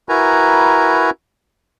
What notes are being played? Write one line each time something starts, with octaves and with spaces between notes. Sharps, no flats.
E4 F#4 A#4 B4 G#5 A#5